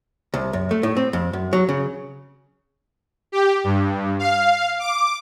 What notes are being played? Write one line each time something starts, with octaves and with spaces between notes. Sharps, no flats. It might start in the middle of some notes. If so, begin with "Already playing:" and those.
C2
F#2
A3
A2
C4
F2
F#2
F#3
C#3
G4
G2
F5
D6